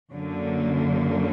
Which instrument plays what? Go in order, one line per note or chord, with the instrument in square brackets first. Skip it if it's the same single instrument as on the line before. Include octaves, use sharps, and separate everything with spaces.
[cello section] F#2 D3 F#3 A#3